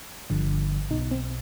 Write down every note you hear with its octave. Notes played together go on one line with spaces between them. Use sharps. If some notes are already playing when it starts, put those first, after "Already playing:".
G1 G2 D3 F3
B1 B2 D#4
C4